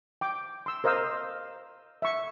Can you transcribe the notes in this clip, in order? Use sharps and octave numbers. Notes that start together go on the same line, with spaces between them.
G5 D6
C6 E6
A#4 C5 D#5 F5 E6
E5 C#6